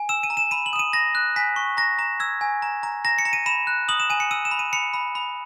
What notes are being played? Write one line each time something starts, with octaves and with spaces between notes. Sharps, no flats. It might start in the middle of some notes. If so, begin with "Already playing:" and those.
Already playing: G#5
E6 E7
D#7
A#5
E7
B5 D#7
F#7
D#6 E7
D#7
B5 A#6
F#6
G#5 B6
C#6
A#5 A#6
A#5
E6 G#6
G#5
A#5
A#5
A#5 A#6
C#7
A#5
D#7
B5 E7
F#6
D#6 F#7
E7
G#5 D#7
C#7
E6 D#7
E7
B5
D#7
B5 C#7
B5
B5